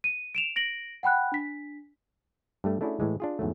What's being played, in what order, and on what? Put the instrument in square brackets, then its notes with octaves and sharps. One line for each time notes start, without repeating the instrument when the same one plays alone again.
[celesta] D#7
D7 E7 F7
A#6 D7 F#7
F#5 G5 B5 F#6
D4 B6
[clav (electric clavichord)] G2 G3 A3
A3 C#4 D4 E4 F#4 G#4
A2 E3 G#3
D4 F4 G#4
E2 G#2 F#3 A3